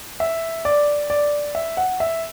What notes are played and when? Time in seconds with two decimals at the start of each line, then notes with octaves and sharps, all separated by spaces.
0.20 E5
0.65 D5
1.10 D5
1.55 E5
1.77 F#5
2.00 E5